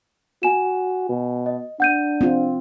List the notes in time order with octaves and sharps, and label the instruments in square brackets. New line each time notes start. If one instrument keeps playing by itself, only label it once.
[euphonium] F#4 [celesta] G#5 E7
[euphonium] B2
[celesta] D#5
[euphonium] D4 [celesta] F#5 G6 D#7
[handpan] C4 F4